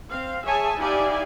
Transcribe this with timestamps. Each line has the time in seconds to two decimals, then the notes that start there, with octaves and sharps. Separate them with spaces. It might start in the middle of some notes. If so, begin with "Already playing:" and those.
0.10 C4 F5
0.45 G#4 C#5 E5 G#5 A5
0.78 D#4 E4 G4 D5 F5 G#5